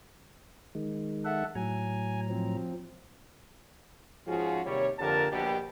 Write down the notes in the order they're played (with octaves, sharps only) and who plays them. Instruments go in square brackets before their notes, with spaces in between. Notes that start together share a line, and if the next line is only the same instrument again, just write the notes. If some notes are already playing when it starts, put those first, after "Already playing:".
[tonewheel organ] D#3 G#3
[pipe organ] A4 E5 F#5
[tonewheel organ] A2 F#3 A#5 [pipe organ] G#5
[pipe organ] F3 C4
[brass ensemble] G#2 F3 C#4 F4 F#4 G#4
D#2 C3 G3 C#5
F2 D3 A#3 G4 A#4 A5
A#1 B2 G4